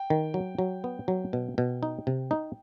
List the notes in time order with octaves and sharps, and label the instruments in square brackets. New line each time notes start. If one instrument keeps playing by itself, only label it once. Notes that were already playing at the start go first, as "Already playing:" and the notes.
Already playing: [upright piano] G5
[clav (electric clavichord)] D#3
F#3
F#3
B3
F#3
B2
B2
D#4
C3
D#4